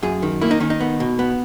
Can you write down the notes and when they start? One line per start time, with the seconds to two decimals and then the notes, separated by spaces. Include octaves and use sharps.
0.03 F#2 G#4
0.22 D#3
0.42 A#3 E4
0.51 D#4
0.60 D#3 C#4
0.70 D#4
0.80 B3
1.00 B2
1.19 B3